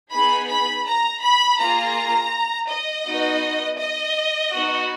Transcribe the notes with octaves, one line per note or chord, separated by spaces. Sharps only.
B3 D#4 G#4 B5
B5
A#5
B5
A#3 F4 G#4 A#5
D#5
B3 D#4 F#4
D#5
B3 D#4 F#4